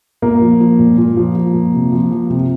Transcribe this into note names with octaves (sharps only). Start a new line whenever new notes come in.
A#2 A#3
F3
F3
A#2
A#2
F3
F3
A#2
C3
F3
F3
C3